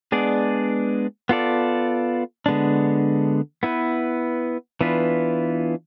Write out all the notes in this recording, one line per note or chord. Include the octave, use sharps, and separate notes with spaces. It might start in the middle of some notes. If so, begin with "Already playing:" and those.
G#3 B3 D4 G#4 D5
B3 F4 A4 D5
D3 G#3 B3 D4
B3 E4 B4
E3 B3 D4 F4 B4